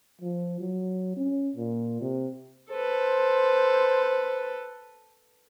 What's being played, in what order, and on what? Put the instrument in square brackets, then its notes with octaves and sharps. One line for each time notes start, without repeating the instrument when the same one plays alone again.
[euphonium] F3
F#3
C#4
A#2
C3
[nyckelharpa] A4 B4 [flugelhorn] C5